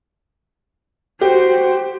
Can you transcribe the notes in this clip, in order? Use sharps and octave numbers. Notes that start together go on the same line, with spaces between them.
F#4 G4 C5